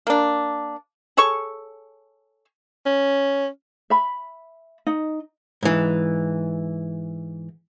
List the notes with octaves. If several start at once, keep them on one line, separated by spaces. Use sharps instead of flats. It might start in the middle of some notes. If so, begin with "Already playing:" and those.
A#3 D4
G#4 A4 C#5 C#6
C#4
E5 B5
D#4 D#5
G#2 E3